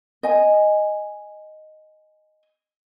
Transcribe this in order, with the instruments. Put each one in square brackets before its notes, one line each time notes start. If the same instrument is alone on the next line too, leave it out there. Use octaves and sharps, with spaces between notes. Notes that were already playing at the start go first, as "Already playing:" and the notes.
[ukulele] D#5 G#5